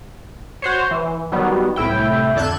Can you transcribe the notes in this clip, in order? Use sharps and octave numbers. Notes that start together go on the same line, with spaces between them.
F#4 C5 C#5
E3
D#3 F#3 G3 B3
C2 A2 E4 G5
F2 D3 A4 F#6 G#6 E7